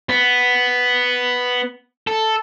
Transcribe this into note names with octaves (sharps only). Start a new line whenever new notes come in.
B3
A4